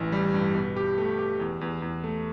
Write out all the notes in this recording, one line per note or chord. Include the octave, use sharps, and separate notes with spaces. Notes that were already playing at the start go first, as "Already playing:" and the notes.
Already playing: A1 E3
G3
G2
B2
G4
A3
G4
E2
E2
E2
A3